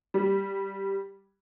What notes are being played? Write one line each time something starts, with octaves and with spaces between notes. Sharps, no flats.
G3